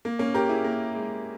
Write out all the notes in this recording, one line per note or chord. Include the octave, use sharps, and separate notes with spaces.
A#3
A#3 C#4
G4 A#4
E4 G#4
A#3
G#3